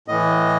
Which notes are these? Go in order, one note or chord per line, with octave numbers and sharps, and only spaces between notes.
A2 E3 D#5